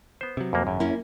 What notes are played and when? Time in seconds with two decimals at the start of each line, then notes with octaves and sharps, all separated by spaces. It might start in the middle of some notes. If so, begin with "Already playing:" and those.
0.21 B3 C5
0.37 C3 F#3
0.53 F2 A#3
0.67 G#1 F#2 C#3
0.80 A#3 C#4 E4